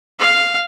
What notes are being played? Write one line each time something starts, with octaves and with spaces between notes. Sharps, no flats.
F5